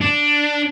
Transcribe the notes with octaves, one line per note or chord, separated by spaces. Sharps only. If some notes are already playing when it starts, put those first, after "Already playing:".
D4